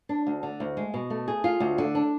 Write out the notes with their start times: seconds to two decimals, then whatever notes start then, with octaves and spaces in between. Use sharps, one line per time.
0.09 D4
0.27 D2
0.43 D3
0.60 D2
0.77 G#3
0.94 B2
1.10 A3
1.28 G#4
1.44 F4
1.60 D2
1.78 D3
1.95 D4